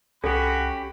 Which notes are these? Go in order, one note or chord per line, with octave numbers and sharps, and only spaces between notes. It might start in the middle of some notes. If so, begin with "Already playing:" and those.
C2 C#4 F#4 G4 A4 B5